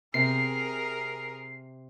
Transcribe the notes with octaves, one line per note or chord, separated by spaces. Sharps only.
C3 G#4 A#4 C7